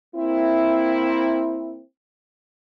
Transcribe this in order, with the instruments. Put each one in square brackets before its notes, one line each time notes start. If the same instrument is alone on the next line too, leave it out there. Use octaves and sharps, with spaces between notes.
[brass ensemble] A#3 C4 E4